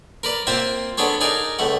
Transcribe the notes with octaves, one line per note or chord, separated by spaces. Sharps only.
A#4 B4 D5
A#3 C4 F4 C5 E5
B3 D4 G#4 A4 C#5
D#4 G#4 A#4 D5
C#2 A3 F#5